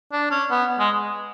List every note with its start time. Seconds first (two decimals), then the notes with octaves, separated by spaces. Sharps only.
0.12 D4
0.31 C#4
0.51 B3
0.79 G#3